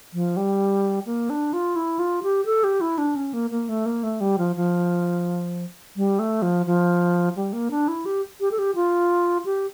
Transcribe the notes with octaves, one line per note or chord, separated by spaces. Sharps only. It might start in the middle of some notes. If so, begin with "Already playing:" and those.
F3
G3
A#3
D4
F4
E4
F4
G4
A4
G4
E4
D4
C#4
A#3
A#3
A3
A#3
A3
G3
F3
F3
G3
A3
F3
F3
G3
A#3
D4
E4
G4
G4
A4
G4
F4
G4